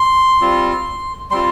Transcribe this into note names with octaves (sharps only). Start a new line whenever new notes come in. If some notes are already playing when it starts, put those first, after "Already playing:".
Already playing: C6
G3 C4 F4
G3 C4 F4 C6